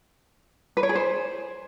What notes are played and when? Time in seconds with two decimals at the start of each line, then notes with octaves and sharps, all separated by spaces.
0.77 B4
0.83 C#5
0.89 G#4
0.95 C5